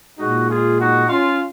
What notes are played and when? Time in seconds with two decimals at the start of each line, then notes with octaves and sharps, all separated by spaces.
0.19 A#2 G#3 D#4 F#4
0.49 F4 G#4
0.79 D#4 F#4
1.09 C#4 F4